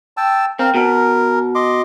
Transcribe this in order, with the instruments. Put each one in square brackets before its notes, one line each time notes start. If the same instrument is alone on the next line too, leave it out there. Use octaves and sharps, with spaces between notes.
[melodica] G5 A5 E6
[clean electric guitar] C4 [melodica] A#4 F5
[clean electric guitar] B2 [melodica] A#4
[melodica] D#5 C6 D6